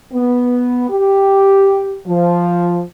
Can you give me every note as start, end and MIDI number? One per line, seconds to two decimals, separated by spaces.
0.12 0.84 59
0.90 1.97 67
2.06 2.81 53